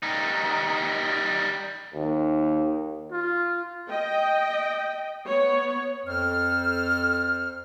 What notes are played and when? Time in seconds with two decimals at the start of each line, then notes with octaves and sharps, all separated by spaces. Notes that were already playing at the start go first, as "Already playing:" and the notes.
0.03 G3 D#4
1.94 D#2
3.12 F4
3.90 D#5 G5
5.27 B3 C#5
6.06 F2 A4 C5 F6